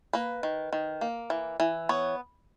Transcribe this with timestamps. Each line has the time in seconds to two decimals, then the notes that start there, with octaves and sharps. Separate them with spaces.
0.13 A#3 B4
0.43 D#3
0.73 D#3
1.01 A#3
1.30 E3
1.60 E3
1.89 B3 C#5